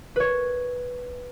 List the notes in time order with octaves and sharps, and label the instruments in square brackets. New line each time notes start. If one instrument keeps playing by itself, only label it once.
[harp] B4 C#5